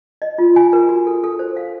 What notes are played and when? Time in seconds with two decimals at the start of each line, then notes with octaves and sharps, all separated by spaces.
0.22 D#5
0.38 F4
0.56 G#5
0.73 A#4
0.89 F#4
1.07 A4
1.24 A4
1.39 C5
1.57 F5